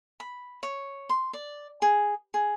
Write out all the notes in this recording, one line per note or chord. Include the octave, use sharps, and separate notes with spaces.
B5
C#5
C6
D5
G#4
G#4